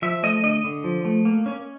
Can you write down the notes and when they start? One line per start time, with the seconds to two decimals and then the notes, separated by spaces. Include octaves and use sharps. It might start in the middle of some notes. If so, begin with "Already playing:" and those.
0.02 F3 E5
0.23 A3 D#5
0.43 D3 D#5
0.64 D3
0.84 F3
1.05 A3
1.25 A#3
1.46 C#4